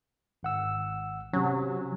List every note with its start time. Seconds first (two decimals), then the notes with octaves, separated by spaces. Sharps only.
0.43 G#1 F#5 E6
1.33 C3 F#3 C#4